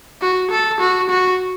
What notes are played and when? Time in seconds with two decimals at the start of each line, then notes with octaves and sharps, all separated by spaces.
0.21 F#4
0.51 A4
0.81 F#4
1.10 F#4